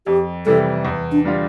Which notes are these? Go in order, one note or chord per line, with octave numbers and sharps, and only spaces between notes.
F2 G4
C3 E3 G3 A4
E2
D4
D3 G3 D4 F4